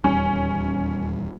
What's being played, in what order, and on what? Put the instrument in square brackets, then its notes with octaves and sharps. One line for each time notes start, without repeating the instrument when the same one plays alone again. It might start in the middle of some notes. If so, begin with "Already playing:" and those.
[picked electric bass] D#1 E2 G3 [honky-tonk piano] C#4